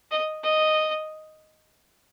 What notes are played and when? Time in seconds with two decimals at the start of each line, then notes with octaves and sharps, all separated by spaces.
0.11 D#5
0.43 D#5